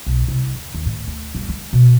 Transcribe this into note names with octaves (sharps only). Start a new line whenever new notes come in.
B1
C2
E2
D#2
A2
D2
G1
G#3
B2